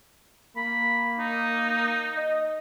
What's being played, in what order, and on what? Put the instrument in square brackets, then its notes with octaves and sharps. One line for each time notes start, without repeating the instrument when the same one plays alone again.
[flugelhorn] A#3 [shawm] B5
[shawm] D#4
[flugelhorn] D#5